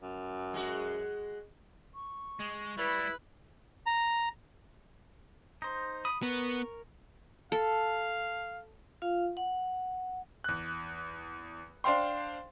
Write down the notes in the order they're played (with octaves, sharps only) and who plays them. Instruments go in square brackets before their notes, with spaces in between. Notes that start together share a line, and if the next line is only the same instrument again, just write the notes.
[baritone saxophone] F#2
[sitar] G#3 F#4
[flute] C#6
[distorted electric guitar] G#3
[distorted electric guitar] G3 [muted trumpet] E4 [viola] B4
[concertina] A#5
[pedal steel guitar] D#4 C5
B5 D#6
[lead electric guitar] B3 [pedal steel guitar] A#4 C#5
[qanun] A4 [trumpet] F5 [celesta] A5
[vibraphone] F4 F5
F#5
[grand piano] E2 F#6
D4 C5 F5 G5 C6